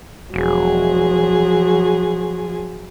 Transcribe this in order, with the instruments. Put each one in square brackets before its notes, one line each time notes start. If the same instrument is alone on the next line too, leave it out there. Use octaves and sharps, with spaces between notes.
[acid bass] E1 [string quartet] F3 F#3 G#4